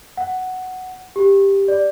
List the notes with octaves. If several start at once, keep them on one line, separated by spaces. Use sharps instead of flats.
F#5
G4
D5